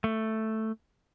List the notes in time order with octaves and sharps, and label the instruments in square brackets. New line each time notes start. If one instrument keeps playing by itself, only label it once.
[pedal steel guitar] A3